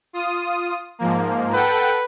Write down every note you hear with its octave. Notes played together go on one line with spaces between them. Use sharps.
F4 D#6 D#7
G#2 F3 A#3
A4 B4 F#5 G5